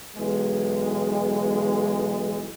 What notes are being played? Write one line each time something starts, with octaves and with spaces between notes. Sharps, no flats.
B1 E3 G#3